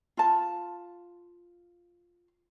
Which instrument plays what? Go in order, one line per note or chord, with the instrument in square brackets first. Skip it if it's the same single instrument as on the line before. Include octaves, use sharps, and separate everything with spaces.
[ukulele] F4 A5